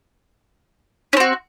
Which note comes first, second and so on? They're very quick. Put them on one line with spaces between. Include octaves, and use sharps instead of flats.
C#4 C4 F#4